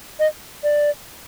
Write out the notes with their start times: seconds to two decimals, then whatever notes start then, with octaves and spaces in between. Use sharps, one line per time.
0.20 D#5
0.63 D5